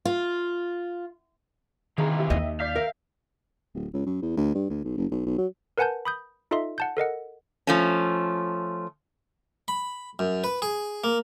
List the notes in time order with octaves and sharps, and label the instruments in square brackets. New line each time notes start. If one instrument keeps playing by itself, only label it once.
[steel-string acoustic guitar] F4
[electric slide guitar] C3 E3 F4 [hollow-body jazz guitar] D#3 [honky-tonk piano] G#4 A#5
[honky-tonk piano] G4 E5
[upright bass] D#2 [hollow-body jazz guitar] D#5
[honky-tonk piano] D5 G6 B6 [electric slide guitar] F5
[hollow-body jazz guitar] A#4 [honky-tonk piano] E5
[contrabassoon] D1
C#2
F#2
E2
D2
G2
D2
B1
F#1
B1
B1
F#3
[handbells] A#4 B4 F#5 G#5 A5 G6
B5 D#6 G6
D#4 F4 A4 D#5 E5 C6
F#5 A5 G6
A4 A#4 D#5 F#5
[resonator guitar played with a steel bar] F3 A3 C#4
[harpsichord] B5
F#2
B4
G#4
A#3